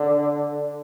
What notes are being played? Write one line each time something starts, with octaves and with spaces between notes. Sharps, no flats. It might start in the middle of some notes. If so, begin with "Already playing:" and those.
Already playing: D3